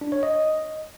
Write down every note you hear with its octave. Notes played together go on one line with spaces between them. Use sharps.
D4
C#5
D#5